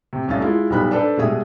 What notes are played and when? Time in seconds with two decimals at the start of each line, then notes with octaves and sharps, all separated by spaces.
0.13 C3
0.28 C2 A3 C#4 F5 A6
0.41 G#3 E4 F4
0.70 B1 G3 B3 B5 F#6
0.91 D4 A4 B4 C5 D5
1.17 B2 G3 G#3 G#4 E5 D#6